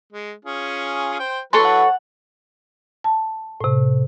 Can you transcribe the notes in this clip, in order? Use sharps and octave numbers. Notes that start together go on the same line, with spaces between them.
G#3
C#4 F4 G#4
C5 G5
F#3 E4 A4 B4 C#5 A5 C6
F#5
A5
A2 C3